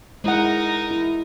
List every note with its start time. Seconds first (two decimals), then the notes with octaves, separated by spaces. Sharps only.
0.24 G#3 D#4 E4 A#4 F#5
0.91 E4